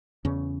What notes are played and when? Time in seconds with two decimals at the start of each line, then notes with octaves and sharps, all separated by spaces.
0.25 E2 C#3 C#4